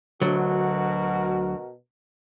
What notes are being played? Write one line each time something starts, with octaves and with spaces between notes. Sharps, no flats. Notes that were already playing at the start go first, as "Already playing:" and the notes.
D2 B2 D3 F#3 F#4 A#4